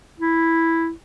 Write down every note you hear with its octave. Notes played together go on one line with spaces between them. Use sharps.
E4